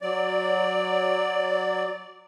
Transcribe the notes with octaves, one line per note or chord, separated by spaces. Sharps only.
F#3 D5